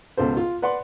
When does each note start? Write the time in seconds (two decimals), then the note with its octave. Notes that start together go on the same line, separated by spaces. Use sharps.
0.17 C#2 B2 A4 C5
0.37 F4
0.62 B4 D5 F#5 C6